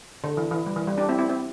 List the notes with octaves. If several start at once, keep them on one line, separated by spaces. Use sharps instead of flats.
D3
E3
E3
G3
E3
G3
D4 G4
C4 E4
C4 E4
C4 E4